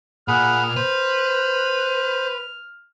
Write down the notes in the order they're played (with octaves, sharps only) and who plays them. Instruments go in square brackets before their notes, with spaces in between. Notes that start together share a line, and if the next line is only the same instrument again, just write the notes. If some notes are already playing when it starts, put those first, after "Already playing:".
[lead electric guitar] A#2 [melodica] G#4 F#5 B5 [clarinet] F6
[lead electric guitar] B4 [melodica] C5